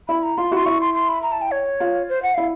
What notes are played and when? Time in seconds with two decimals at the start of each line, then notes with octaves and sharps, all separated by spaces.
0.08 E4 B5
0.23 A#5
0.37 F4 C6
0.51 E4 F#4 C6
0.66 E4 C#6
0.81 C6
0.94 C6
1.09 B5
1.23 A#5
1.32 A5
1.42 G5
1.51 C#5
1.80 F4
2.09 C5
2.23 F#5
2.34 E4 F5